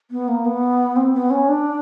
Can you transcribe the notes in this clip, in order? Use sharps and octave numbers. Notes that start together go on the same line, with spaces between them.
B3
A#3
B3
C4
B3
C#4
D4